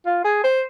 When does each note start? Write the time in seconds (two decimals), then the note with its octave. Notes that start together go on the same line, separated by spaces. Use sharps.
0.06 F4
0.24 G#4
0.44 C5